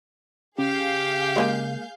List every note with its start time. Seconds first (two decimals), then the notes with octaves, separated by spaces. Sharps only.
0.58 C#3 G4 G#4 F5 G6
1.36 G#3 A#3 G#5